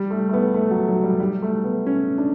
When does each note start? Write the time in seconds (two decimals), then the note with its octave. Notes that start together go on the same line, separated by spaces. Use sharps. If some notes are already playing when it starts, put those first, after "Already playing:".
Already playing: G3
0.10 A3
0.29 A3
0.33 B3
0.54 A3
0.71 F#3
0.88 F#3
1.03 G3
1.20 G3
1.42 A3
1.64 B3
1.87 C#4
2.18 D4